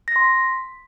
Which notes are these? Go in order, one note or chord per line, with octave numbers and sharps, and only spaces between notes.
A#6
C6
B6